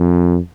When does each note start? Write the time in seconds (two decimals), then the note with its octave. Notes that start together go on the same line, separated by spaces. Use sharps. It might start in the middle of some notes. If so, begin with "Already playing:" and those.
Already playing: F2